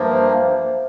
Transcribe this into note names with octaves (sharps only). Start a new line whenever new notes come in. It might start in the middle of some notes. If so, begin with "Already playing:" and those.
Already playing: G2 F3 A#3 C5 E5